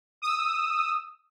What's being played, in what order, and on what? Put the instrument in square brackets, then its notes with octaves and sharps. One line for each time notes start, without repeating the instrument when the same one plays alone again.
[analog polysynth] D#6 E6